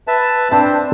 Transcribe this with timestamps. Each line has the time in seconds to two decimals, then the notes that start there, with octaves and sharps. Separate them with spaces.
0.08 B4 E5 A5
0.52 C4 D4 C5 A5